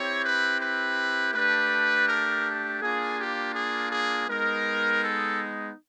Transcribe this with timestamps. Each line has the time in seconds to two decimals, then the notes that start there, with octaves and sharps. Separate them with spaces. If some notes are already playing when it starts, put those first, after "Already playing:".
Already playing: C4 E4 G4 C#5
0.24 B4
0.60 B4
1.34 A3 D4 G4 B4
2.08 A#4
2.81 A#3 D4 F4 G#4
3.18 G4
3.54 G#4
3.91 G#4
4.28 G#3 B3 D#4 A#4
5.02 A4